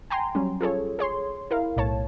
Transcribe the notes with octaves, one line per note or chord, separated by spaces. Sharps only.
G5 G#5 A#5 C6
F#3 G3 C#4
F4 G#4 A4 C#5
G#4 C#5 C6
E4 A#4 F5
B1 A2 C#5 A5